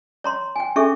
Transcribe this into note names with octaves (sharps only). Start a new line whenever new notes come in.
C#5 A#5 C6
G5 G#5
C#4 D4 G#4 A4 E5 C#6